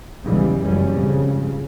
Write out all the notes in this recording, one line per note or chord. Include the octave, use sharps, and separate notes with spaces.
B1 E2 C#3 E3 G3 G#3
F#1 C#2 F#2 G3 C#4
F2 G#2 C#3